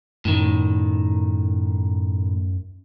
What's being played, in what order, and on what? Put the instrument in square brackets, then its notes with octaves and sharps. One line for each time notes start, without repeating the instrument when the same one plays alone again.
[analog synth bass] F#2 [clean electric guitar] A2 D#3